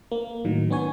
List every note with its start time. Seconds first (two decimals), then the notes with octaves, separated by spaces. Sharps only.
0.12 A#3
0.45 A2 D#3 F#3
0.70 B3 C#4 C#5 G#5